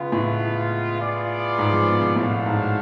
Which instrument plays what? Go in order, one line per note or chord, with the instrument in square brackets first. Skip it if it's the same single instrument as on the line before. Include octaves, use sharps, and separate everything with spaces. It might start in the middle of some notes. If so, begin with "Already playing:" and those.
Already playing: [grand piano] C#3 [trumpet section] G#3 B3 F4 B4
[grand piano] A2
[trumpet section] B3 F4 G#4 D5
[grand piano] G#2
F3
B2
B2
[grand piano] A2 [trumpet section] A3 D4 F#4 C#5 F5
[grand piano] G#2